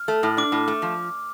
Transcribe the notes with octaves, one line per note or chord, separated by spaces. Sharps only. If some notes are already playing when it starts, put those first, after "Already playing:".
Already playing: F6
A3
A2
D4 D6
A2
A3
F3